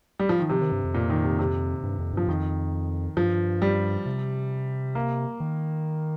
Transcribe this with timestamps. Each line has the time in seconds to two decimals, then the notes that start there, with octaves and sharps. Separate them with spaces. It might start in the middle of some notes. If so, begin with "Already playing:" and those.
0.19 G3
0.29 F3
0.40 D#3
0.49 C3 F3
0.62 D#3
0.72 G2
0.84 F2
0.94 A#2
1.10 D#3
1.24 C3
1.39 C3
1.83 G2
1.99 F2
2.13 G2 F3
2.28 F2 D#3
3.17 G2 F3
3.62 G3
4.06 C3
4.95 A#3
5.40 D#3